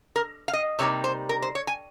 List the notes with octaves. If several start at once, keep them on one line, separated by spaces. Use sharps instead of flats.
A#4
F5
D#5
C3 G3 A#3 D#4 C#5
C5
A#4
C5
C#5
G#5